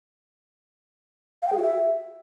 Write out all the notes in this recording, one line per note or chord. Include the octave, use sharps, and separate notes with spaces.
F5
G5
G#4
F#4
E5